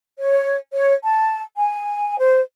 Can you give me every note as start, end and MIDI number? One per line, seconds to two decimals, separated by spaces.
0.18 0.56 73
0.72 0.94 73
1.04 1.41 81
1.57 2.17 80
2.18 2.41 72